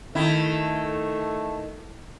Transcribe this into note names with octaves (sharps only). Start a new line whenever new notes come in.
D#3 A3 E4